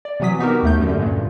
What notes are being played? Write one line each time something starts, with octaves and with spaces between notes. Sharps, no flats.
D5
C3 E3 F#3 D#6 B6
B3 D#4 F#4 G4 A#4
D#2 A3 G6
F#2 D3
G2 A#2